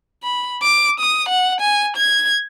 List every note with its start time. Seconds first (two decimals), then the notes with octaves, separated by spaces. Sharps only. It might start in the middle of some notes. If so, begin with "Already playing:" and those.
0.23 B5
0.63 D6
1.00 D#6
1.29 F#5
1.61 G#5
1.97 G#6